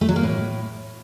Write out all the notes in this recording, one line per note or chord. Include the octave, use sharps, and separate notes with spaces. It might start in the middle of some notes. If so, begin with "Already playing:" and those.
A3
F#3
A#3
A2